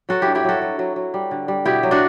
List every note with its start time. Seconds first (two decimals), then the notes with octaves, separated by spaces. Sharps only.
0.09 F#3 F#4 A4
0.22 G2 E4 G4
0.35 E4 G4
0.44 F#3 F#4 A4
0.62 F#3
0.79 F#3
0.96 F#3
1.14 G3
1.31 D3
1.48 G3
1.65 B2 E4 G4
1.83 F#3
1.91 D4 F#4